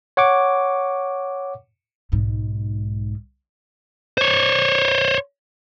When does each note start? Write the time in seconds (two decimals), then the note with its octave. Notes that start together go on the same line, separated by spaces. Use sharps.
0.17 C#5 F#5 C#6 D6
2.12 B1 G#2
4.18 C5 C#5